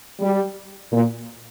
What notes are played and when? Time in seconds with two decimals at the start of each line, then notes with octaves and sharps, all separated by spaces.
0.21 G3
0.92 A#2